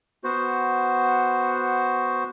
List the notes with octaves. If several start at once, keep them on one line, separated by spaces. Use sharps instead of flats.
B3 F#4 C5